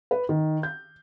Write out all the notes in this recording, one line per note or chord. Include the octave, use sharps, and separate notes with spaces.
B4
D#3
G6